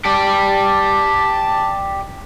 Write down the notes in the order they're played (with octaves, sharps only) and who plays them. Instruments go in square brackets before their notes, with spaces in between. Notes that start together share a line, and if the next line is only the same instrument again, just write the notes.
[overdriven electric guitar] G4 D5 [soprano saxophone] A5